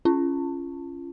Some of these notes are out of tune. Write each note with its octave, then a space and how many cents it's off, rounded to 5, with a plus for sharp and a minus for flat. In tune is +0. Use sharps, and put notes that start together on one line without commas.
C#4 +0 F4 -30